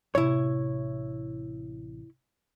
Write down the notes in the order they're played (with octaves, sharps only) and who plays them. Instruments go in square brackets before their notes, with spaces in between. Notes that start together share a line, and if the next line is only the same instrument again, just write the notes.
[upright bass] A1 C3 [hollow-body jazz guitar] E4 C#5